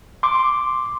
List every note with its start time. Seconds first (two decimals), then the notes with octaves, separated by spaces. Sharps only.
0.23 C6 D6